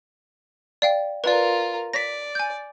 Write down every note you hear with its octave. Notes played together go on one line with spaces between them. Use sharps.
D5 F5 G5
F4 A#4 B4 D5
D5 A#6 B6
G#5 G6